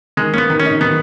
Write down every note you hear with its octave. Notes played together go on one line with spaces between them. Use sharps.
D#3 G#3
A#3 C#4
B3
D#3
C#4
D#4
D#3 B3